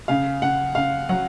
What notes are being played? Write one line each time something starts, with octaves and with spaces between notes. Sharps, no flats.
C#3 F5
C#3 F#5
C#3 F5
F#3 F#5